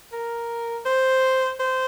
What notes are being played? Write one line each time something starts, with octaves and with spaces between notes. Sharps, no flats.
A#4
C5
C5